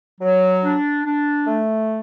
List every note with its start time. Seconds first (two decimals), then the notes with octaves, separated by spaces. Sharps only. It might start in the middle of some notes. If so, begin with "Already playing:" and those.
0.20 F#3
0.62 D4
1.04 D4
1.46 A3